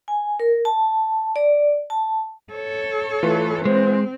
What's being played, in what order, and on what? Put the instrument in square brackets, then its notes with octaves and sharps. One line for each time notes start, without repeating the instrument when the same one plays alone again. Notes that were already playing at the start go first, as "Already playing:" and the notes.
[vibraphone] G#5
A#4
A5
D5
A5
[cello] A4 C#5
[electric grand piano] E3 F4 B4 [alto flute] A3
[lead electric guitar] G#3 [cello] C4 [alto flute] C5